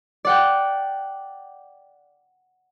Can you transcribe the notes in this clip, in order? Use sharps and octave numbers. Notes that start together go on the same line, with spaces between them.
D5 F#5 G5